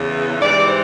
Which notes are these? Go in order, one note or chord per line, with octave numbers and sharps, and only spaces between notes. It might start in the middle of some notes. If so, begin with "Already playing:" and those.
Already playing: E2 C#3 E3
G#2 E3 G3 D5
C5